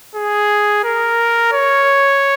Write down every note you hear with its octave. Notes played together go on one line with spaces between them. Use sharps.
G#4
A#4
C#5